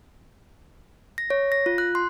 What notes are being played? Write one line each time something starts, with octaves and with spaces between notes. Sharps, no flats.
A#6
C#5
A#6
F4
F#6
C6